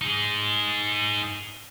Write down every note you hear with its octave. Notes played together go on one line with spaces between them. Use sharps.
D#4 G#4